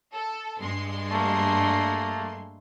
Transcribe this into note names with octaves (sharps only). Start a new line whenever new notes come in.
A4
G2 G#3 C6
A3 A#3